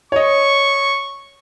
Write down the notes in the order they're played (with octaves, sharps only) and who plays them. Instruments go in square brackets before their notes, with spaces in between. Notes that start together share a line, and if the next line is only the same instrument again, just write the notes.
[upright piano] C#5 D#5 [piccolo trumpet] C#6